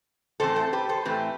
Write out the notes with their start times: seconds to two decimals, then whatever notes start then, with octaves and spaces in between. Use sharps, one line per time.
0.40 A2 E3 A3 C4 A4 C5
0.56 A4 C5
0.73 G4 B4
0.89 A4 C5
1.05 A2 E3 A3 C4 G4 B4